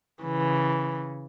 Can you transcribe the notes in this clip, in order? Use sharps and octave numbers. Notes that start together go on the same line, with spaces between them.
C#3 E3